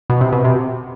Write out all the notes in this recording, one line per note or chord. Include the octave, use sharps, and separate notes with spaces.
B2
C3
B2
C3